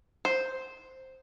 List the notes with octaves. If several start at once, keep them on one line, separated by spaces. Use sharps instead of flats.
C5